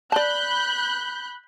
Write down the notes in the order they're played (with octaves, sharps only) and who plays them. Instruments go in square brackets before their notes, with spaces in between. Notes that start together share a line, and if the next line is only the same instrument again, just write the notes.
[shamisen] D5 A5 [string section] B5 F#6 G6